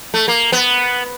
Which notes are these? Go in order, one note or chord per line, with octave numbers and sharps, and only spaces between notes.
A3
A#3
B3